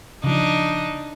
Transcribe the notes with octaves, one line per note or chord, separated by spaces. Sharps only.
C#3 F3 D4 D#4